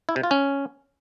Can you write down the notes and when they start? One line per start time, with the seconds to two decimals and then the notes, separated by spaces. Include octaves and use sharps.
0.09 E4
0.16 C3
0.23 F4
0.31 C#4